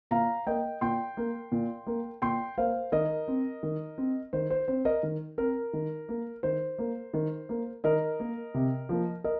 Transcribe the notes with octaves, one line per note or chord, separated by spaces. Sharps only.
A#2 F5 A#5
A#3 D#5 G5
A#2 G5 C6
A#3
A#2
A#3
A#2 G5 C6
A#3 C5 F5
D#3 A#4 D#5
C4
D#3
C4
D#3 C5
C5
C4 C5
A#4 D#5
D#3
C4 A#4
D#3
A#3
D#3 C5
A#3
D#3
A#3
D#3 A#4 D#5
A#3
C3
F3 A#3
A#4 D#5